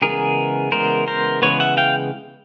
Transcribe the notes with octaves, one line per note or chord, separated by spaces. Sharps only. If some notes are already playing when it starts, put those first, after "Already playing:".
C#3 E3 G#3 B3 G#4 A#4
C#3 E3 G#3 B3 A#4 C5
A#4 C5
C#3 E3 G#3 B3 B4 C#5
E5 F#5
F5 G5